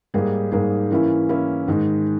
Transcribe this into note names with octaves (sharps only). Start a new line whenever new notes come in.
G#2 G3 A#3 D#4 G#4
G#2 G3 A#3 D#4 G#4
E3 A#3 C#4 E4
E3 A#3 C#4 E4
G#2 D#3 G#3 D#4